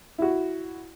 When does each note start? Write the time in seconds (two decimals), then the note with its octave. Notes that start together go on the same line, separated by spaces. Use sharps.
0.18 E4 F#4